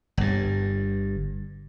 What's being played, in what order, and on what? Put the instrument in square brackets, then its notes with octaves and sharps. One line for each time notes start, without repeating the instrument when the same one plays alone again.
[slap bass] G1 G2